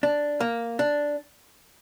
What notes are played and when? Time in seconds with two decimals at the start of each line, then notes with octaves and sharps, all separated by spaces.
0.03 D4
0.40 A#3
0.79 D4